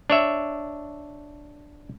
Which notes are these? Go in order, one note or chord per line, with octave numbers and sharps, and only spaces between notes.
D4 C#5 E5